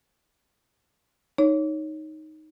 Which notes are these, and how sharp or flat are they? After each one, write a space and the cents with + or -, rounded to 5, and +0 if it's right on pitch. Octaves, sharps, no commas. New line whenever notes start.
D#4 +0 C#5 +0